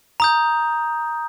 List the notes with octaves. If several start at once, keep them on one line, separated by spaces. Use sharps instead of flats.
A#5 D#6 G6